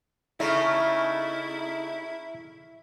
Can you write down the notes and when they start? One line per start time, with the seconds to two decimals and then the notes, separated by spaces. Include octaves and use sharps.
0.40 C#3 A3 D#4 E4 E5 C#6 F6